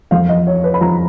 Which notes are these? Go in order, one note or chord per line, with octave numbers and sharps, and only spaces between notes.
F2 F3 F5
D#5
C#5
B4
B5
F3 A#5